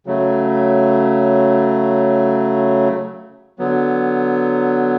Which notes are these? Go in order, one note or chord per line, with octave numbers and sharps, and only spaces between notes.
C#3 F#3 A3
D3 F#3 B3